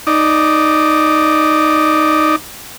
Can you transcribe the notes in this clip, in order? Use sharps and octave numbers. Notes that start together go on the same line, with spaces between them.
D#4 D5